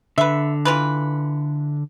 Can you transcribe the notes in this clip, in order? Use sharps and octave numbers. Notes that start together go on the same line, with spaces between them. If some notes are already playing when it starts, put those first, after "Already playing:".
D3 B4 E5
E3 F4 B4